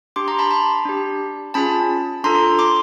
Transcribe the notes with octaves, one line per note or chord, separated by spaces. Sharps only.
D4 G4 C6 D6
A#5 C6
A5 B5
A5 B5
D4 G4
C#4 F4 G#4 A5 B5
D4 F4 A4 A#5 C6
C6 D6